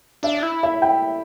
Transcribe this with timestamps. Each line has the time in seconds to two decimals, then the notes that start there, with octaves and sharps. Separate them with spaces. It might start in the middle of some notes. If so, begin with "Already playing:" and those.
0.23 D4 E5
0.43 E4
0.63 E5
0.82 G5